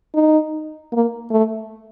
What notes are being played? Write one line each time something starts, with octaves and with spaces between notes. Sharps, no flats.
D#4
A#3
A3